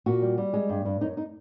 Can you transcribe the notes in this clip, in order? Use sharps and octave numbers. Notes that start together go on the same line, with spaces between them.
A#2 F#4
G3
G3
G#3
G2
G2
F#2 D#4
D#4